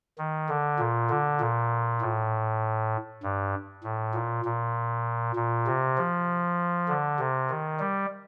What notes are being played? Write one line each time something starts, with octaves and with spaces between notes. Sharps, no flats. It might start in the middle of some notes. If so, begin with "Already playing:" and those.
D#3
D3
A#2
D3
A#2
A2
G2
A2
A#2
A#2
A#2
C3
F3
D3
C3
D#3
G3